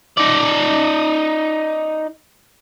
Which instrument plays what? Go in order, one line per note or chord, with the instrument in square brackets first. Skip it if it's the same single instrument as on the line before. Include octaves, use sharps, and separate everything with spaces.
[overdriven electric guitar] D#4 D5